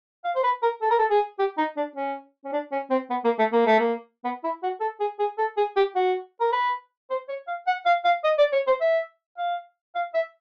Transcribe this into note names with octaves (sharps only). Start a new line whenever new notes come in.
F5
C5
B4
A#4
A4
A#4
A4
G#4
G4
D#4
D4
C#4
C#4
D4
C#4
C4
B3
A#3
A3
A#3
A3
A#3
B3
E4
F#4
A4
G#4
G#4
A4
G#4
G4
F#4
A#4
B4
C5
C#5
F5
F#5
F5
F5
D#5
D5
C#5
C5
E5
F5
F5
E5